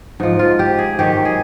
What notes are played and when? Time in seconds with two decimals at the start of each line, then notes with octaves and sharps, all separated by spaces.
0.20 G#2 F3 D#4
0.39 F4
0.59 G4
0.79 G#4
0.99 G#2 D#3 F#3 G4
1.25 G#4